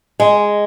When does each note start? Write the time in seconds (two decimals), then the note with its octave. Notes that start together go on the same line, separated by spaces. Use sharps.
0.20 G#3